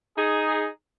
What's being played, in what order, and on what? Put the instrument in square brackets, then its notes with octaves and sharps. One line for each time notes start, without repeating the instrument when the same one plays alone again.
[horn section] D#4 G#4